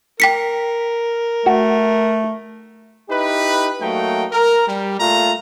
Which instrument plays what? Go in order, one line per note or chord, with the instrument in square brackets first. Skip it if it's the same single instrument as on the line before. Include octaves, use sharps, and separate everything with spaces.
[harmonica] A#4 [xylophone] G5 B6 C#7
[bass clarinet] A3 [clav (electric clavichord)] F#4
[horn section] D#4 E4 G4 B4
F#3 A3 A#3 D#4 G5
A#4
G3
A#2 A3 F4 A#5